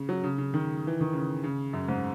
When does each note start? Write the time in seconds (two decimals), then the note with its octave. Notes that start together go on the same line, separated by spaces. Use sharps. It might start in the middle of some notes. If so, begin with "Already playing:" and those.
Already playing: C#3
0.09 F#3
0.23 C#3
0.38 C#3
0.54 D#3
0.87 E3
1.01 D#3
1.13 C#3
1.44 C#3
1.73 F#2
1.88 G#2